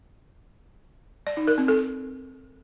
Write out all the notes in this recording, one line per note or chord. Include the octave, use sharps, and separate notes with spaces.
D5
D#4
A#4
C4
A4